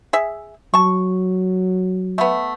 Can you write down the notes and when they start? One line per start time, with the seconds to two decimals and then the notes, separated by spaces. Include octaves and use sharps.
0.13 G#4 E5
0.74 F#3 A5 C#6
2.18 A3 B3